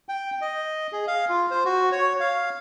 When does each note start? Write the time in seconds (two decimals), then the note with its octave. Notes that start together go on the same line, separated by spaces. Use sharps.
0.09 G5
0.41 D#5
0.92 G#4
1.07 F5
1.29 F4
1.51 C5
1.65 F#4
1.92 C#5
2.20 F5